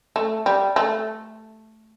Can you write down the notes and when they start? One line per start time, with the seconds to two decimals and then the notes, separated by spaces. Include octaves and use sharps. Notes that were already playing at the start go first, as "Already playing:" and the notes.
0.16 A3
0.46 G3
0.76 A3